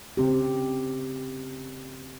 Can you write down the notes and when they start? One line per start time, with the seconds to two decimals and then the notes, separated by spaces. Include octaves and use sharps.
0.17 C#3 C4 G4